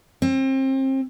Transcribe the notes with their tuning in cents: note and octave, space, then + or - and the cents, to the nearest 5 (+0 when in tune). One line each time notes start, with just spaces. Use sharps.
C4 +30